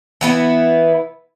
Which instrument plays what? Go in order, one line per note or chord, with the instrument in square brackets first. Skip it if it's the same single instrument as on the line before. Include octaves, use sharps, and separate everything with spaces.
[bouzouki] E3 B3 E4